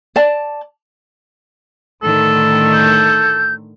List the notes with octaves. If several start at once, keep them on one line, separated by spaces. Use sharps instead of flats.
D5 A5
A2 D3 D#3 A4
G6